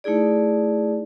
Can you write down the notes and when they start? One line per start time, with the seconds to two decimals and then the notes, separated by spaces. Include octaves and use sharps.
0.04 A3 D#4 E4 G#4 D5